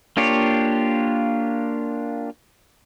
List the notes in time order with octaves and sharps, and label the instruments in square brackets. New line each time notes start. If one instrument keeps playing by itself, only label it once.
[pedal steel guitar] A#3 D4 F4 G4 C#5